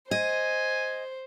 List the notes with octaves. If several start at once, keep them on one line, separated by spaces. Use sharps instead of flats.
C5 D#5 G#5